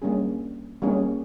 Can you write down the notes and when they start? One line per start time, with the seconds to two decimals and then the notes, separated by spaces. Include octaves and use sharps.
0.02 G3 A#3 C#4 G#4
0.82 G3 A#3 C#4 G#4